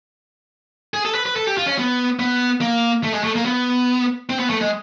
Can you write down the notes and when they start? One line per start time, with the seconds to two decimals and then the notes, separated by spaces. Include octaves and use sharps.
0.94 G#4
1.05 A4
1.15 B4
1.26 B4
1.36 A4
1.47 G4
1.58 F4
1.67 C#4
1.78 B3
2.19 B3
2.61 A#3
3.04 A3
3.14 G#3
3.24 A3
3.35 A#3
3.46 B3
4.30 C4
4.39 B3
4.50 A3
4.61 G#3